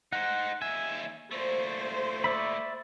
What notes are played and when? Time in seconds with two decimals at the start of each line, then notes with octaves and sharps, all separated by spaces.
0.13 D#4 C5 F#5
0.62 D#2 E5 G#5
1.31 A#2 A3 C5
2.24 D5 E5 B5